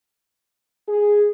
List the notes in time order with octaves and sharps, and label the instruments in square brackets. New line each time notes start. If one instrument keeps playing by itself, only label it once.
[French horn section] G#4